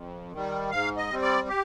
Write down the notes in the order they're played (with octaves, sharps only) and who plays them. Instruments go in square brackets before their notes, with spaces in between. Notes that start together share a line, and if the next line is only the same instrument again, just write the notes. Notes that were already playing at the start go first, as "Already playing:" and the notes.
Already playing: [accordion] F2
D#3 G3
G#2 F5
D#5
G3 C4
D5
G4